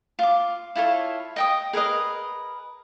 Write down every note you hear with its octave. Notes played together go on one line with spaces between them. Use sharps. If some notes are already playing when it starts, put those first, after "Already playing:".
F4 D6
E4 F4 A4 C#5
D#5 G5 D#6
G#4 A#4 B4 D#5